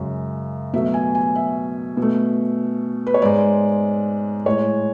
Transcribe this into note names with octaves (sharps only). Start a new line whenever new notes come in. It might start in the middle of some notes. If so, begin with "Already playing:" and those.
Already playing: F#2 C#3 G#3
B2 F#3 A3 E5
G#5
G#5
E5
B2
A3
B4
C#5
G#2 G#3 D5
A2 G#3 C#5